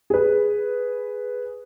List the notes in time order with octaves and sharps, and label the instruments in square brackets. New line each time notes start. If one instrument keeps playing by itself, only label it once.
[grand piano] G#4 B4